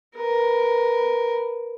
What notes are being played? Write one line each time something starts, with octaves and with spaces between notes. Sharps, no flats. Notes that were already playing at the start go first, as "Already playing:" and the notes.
A#4 B4